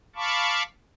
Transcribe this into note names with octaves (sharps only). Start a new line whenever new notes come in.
F5 A5 B5 C#6 D6